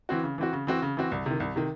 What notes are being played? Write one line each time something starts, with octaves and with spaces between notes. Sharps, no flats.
E3 C4 F#4
C#3
E3 C4 F#4
C#3
E3 C4 F#4
C#3
E3 C4 F#4
C2
C3 D#3
C2
C3 D#3